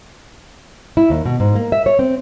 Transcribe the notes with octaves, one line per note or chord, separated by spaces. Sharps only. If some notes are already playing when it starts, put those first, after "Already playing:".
E4
D#2
B2
G#2
A#3
E5
C#5
C4